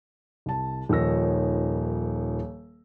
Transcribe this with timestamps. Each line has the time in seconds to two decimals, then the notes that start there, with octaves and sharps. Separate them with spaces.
0.46 C2 A5
0.89 D#1 D#3 F3 C#5 E6 A#6